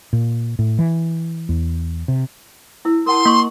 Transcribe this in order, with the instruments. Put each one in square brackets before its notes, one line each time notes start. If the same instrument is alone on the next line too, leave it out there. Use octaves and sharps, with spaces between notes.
[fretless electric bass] A#2
A2
E3
E2
C3
[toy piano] E4 B4 E6
[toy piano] A#4 F#5 A5 [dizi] C6
[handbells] A#3 C#6